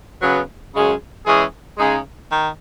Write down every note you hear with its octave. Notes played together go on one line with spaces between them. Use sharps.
C#3 F#3 B3
F#2 C#3 G#3 C#4 G#4
E3 G#3 C#4 G#4
C#3 G#3 D#4 G#4
D#3